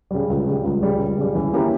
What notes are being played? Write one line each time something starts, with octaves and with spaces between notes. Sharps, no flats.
C#3 G3
C#2
C#3 G3
C#2
C#3 G3
C#2
C#3 G3
E3
A#3 C#4 E4 G4